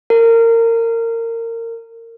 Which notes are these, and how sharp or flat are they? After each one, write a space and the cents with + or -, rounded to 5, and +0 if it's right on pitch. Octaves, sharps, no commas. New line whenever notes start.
A#4 -25